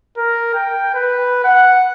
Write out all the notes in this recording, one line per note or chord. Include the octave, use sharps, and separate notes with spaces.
A#4
G5
B4
F#5